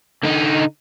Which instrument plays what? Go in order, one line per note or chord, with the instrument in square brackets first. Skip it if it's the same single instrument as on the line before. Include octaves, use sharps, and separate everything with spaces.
[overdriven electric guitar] D3 D#4